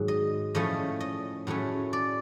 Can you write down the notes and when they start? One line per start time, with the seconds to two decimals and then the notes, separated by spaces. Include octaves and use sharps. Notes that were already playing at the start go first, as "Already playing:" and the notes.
Already playing: G#2 D#3 F#3
0.08 D#5
0.55 A2 F3 A3 C#4 D#5
1.00 D#5
1.47 A2 F#3 A3 C#4
1.93 D5